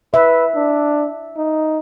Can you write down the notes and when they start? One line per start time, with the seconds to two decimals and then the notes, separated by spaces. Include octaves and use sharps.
0.14 B4 E5
0.55 D4
1.37 D#4